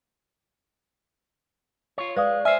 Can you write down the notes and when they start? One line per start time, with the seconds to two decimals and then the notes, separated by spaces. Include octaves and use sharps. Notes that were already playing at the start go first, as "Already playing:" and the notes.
1.98 F4 C#5
2.16 G#3 B4 D5 F5 D#6
2.45 C5 E5 G#5 F6